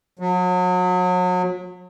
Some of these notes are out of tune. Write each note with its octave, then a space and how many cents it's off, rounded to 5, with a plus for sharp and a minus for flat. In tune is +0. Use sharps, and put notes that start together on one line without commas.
F#3 -35